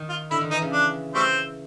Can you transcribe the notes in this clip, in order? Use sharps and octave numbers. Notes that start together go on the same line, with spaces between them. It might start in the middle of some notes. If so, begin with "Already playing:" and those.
Already playing: D#3
F4
D3 E4
D#3
E3 D#4
C#3
D4
G3 A3 C4